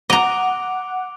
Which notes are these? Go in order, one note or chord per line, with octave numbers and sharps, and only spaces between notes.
D#5 F#5 A#5 D6 D7 F7